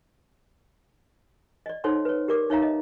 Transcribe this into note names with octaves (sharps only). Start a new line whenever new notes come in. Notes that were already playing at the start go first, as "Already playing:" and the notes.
D5 D#5
D#4 A4 C5 C#5 F#5 C6
B4 C#5
G4 A#4 D5 D6
D#4 C#5 E5 F5 A#5
D#5